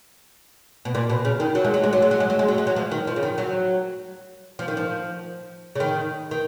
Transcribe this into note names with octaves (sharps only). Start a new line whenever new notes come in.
B2
A#2
B2
C#3
D#3
F#3
G#3
F#3
G#3
F#3
G#3
F#3
G#3
F#3
G#3
F#3
G#3
F#3
F3
D#3
F3
C#3
D#3
F#3
F3
D#3
F3
C#3
D#3
D#3